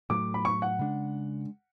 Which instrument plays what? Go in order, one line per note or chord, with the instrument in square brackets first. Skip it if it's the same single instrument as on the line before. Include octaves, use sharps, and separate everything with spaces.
[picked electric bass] A2 F#3 A3 [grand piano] D6
[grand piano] B5
C#6
F#5
[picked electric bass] C#3 G#3 D4